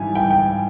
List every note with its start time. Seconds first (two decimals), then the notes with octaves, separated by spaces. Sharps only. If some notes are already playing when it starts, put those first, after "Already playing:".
Already playing: G#2 E3 G3 G#5
0.15 G5
0.31 G5